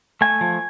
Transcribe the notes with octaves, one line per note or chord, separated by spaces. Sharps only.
A3 G#5
F3